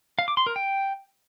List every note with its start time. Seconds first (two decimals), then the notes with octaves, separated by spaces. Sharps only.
0.19 F5
0.28 D6
0.37 C6
0.46 A#4
0.56 G5